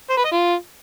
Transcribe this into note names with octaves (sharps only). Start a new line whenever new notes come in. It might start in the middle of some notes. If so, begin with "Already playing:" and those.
C5
B4
D#5
F4